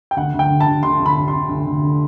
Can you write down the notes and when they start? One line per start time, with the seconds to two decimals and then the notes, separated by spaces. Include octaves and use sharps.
0.11 G5
0.16 D2 F#5
0.34 D2
0.39 G5
0.50 D3
0.60 A5
0.66 D3
0.83 D2 C6
1.00 D2
1.06 B5
1.16 D3
1.28 C6
1.33 D3
1.49 D2
1.66 D2
1.82 D3